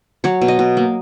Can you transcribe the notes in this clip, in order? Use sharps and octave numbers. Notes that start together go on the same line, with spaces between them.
F#3 C#5
B2
D#5
B2
A#3